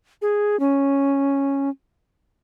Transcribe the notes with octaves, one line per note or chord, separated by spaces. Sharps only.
G#4
C#4